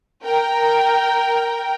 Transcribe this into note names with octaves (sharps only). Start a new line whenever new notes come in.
A#4 G5